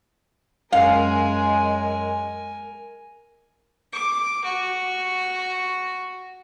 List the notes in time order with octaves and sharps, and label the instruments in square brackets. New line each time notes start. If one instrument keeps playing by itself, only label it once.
[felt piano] F#2 [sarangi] G#3 [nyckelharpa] A#4 G#5 [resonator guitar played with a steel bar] F5
[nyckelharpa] D6
F#4